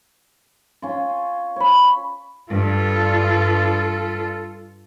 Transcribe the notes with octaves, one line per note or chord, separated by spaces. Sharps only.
C#4 F4
C#5 B5
G2 F4 A4